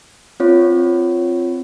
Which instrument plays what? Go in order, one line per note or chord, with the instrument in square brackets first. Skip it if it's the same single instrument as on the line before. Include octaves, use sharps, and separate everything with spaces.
[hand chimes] C4 F4 C#5